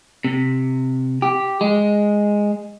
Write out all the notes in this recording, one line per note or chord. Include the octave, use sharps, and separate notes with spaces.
C3
G4
G#3